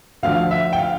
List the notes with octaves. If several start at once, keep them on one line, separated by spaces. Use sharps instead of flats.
D2 D3 F3 F5
E5
G5
F5